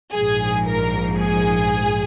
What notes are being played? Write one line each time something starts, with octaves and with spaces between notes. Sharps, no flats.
A#1 G#2 F3 G#4
A#4
G#4